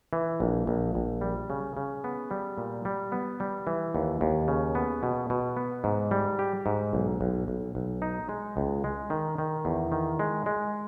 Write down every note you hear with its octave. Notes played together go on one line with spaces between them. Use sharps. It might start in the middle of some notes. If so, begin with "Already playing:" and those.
E3
A#1
A#1
A#1
G3
C#3
C#3
B3
G3
A#2
G3
B3
G3
E3
D#2
D#2
C#3
B3
B2
B2
B3
G#2
G3
G4
G#2
B1
B1
B1
B1
D#4
G#3
C#2
G#3
D#3
D#3
E2
D#3
G#3
G#3